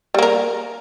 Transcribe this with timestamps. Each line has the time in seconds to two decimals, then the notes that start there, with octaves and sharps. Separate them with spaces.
0.14 G3
0.18 A#3
0.23 A#4